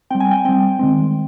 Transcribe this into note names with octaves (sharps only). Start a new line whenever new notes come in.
G3 C4 G5
G#5
G5
G3 C4 G5
D#3 G#3 C4